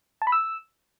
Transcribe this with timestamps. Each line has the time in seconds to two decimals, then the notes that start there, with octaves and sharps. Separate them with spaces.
0.22 A5
0.27 B5
0.32 E6